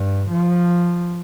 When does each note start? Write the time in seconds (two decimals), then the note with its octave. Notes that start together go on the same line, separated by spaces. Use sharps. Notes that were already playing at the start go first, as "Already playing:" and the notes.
Already playing: G2
0.30 F3